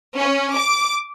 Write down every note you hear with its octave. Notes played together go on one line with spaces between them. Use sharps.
C#4
D6